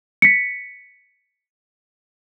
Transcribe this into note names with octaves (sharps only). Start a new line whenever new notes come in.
B6 C#7